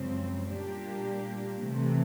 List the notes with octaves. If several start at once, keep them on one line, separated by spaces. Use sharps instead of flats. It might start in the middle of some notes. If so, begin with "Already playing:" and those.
Already playing: F#2 C#3 F3 G#3 C4
A#2 G3 A#3 D4 G4
C3 E3 A3